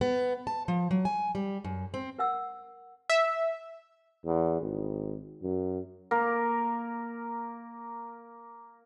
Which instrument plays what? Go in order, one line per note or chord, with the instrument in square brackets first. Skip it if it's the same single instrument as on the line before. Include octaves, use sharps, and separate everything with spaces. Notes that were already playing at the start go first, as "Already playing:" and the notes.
[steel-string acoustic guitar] B3
A5
F3
F#3
G#5
G3
F#2
C4
[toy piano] A#4 F#5 E6
[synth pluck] E5
[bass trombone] E2
G#1
F#2
[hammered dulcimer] A#3 A#4